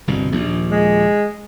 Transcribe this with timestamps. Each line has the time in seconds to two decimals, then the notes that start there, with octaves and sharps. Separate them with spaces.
0.07 G1 C2 B2
0.32 A#1 D#2
0.71 G#3